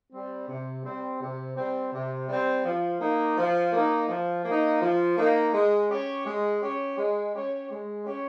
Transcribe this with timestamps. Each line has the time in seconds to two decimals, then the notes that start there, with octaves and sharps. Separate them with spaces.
0.12 G3 C4
0.48 C3
0.85 G3 C4
1.21 C3
1.56 G3 C4
1.92 C3
2.29 G3 C4
2.65 F3
3.01 A#3 D#4
3.37 F3
3.73 A#3 D#4
4.08 F3
4.45 A#3 D#4
4.81 F3
5.18 A#3 D#4
5.53 G#3
5.90 C#4 G4 C#5
6.26 G#3
6.62 C#4 G4 C#5
6.98 G#3
7.34 C#4 G4 C#5
7.71 G#3
8.06 C#4 G4 C#5